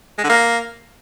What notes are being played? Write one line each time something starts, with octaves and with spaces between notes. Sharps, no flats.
G#3
D3
A#3